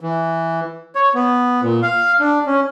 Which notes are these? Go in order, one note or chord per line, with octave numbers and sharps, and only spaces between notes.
E3
C#5
B3
A#2
F5
D4
C#4